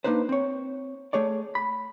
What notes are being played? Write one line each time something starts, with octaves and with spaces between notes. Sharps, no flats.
A#3 D4 D#4 B4 C5
C4 C#5
A3 G#4 C#5 D5
B5